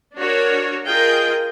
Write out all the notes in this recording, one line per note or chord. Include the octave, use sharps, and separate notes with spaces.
D4 F#4 A#4 C#5
F4 G#4 A#4 D#5 G5